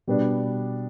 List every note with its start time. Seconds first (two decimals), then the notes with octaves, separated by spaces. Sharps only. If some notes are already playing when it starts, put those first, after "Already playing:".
0.07 B2 G3 B3 D4